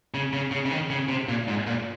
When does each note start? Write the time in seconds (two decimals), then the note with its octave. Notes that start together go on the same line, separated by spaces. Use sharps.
0.14 C#3
0.33 C#3
0.52 C#3
0.66 C#3
0.71 D#3
0.90 C#3
1.09 C3
1.29 A#2
1.48 G#2
1.67 A#2